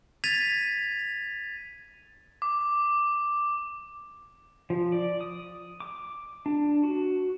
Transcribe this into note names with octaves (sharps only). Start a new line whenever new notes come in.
G#6 A6 B6 D#7 F7
D6
F3
D5
D#6
D6
D4
F#4